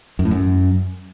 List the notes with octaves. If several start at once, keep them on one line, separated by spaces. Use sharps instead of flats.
F#2
A2
F#2